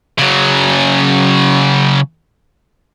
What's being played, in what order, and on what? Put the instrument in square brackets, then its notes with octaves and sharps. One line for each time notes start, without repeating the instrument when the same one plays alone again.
[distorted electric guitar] C#3 F#3